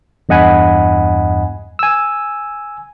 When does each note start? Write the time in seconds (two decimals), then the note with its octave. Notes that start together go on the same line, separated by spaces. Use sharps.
0.29 E2 G2 D#5 F#5 G#5 B5
1.79 G#5 E6